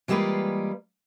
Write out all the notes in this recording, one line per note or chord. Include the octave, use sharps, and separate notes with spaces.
E3 G3 G#3 A#3 F4 B4